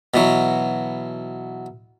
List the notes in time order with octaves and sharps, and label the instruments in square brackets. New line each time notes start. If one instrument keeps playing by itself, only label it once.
[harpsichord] B2 E3 F#3